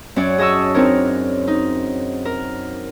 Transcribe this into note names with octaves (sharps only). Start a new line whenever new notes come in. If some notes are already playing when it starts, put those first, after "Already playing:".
F#2 C#4 F#4 C#5 D5
G#4 D#5 A5 C#6 E6
C4 D4 D#4 A#4 C#5
D#4
A#4